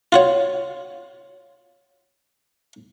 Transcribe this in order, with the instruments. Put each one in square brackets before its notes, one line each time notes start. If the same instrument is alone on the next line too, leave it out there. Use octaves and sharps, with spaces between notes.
[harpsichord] F4 F#4 C#5